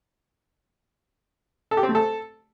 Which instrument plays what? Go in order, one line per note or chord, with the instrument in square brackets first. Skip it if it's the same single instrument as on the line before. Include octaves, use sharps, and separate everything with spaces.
[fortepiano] A4
G4
C4
A3
A4